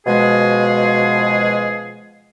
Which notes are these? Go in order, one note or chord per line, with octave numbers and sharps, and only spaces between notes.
B2 F3 G#3 G#4